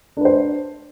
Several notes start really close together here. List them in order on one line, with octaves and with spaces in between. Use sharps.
D4 B4 C5